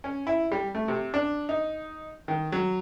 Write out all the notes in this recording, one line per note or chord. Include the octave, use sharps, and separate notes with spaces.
C#4
E4
G3
A3
C3
D4
D#4
D#3
F#3